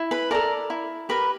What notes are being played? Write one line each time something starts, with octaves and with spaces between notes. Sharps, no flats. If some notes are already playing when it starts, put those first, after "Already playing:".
Already playing: E4
B4 B5
A4 A#4 D5 A#5
E4
G4 A#4 B4 B5